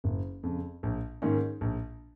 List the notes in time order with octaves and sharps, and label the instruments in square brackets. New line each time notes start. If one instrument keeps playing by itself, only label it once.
[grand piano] F#1
F2 C#3
A#1
G#2 D#3 A#3 C#4
A#1